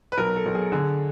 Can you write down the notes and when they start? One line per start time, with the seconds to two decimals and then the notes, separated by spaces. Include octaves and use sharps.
0.12 B4
0.18 B1 A#4
0.36 A4
0.46 B1
0.55 G#4
0.72 D3 G#4